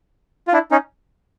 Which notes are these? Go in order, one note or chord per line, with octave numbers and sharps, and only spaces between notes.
F4
D4 E4
C#4 D#4